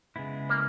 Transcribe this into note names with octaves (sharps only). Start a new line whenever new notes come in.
C#3 G#3 B3 E4
A#3